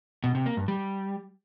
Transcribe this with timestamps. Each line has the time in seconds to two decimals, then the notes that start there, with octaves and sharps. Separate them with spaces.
0.24 B2
0.35 C3
0.46 A#3
0.57 G2
0.68 G3